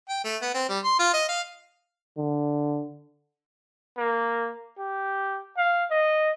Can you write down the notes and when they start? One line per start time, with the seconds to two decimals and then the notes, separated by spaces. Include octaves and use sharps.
0.09 G5
0.24 A3
0.42 B3
0.54 C4
0.69 G3
0.84 C6
0.99 F4
1.14 D#5
1.29 F5
2.17 D3
3.98 A#3
4.79 G4
5.57 F5
5.91 D#5